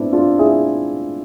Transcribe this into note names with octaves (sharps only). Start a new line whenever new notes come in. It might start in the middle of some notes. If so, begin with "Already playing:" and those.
Already playing: B3 C4 D4 E4
D4 F4
E4 G#4